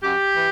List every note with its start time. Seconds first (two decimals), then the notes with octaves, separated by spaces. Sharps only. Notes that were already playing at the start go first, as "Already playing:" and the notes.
0.03 F#2 G4
0.36 E3